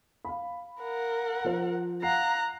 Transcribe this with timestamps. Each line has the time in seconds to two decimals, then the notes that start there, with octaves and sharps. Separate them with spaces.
0.25 F5 B5
0.82 A#4 F#5
1.44 F3 C5
2.02 F5 F#5 A#5 F#6 C7